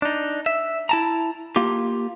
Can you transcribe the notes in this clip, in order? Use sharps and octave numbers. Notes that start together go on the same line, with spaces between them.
D4 D#4
E5
E4 A5 A#5
A#3 F4 G4